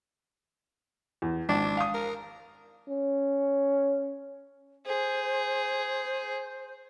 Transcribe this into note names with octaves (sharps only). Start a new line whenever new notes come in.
E2
G#1 D4
F5 D#6
A#4
C#4
G#4 C5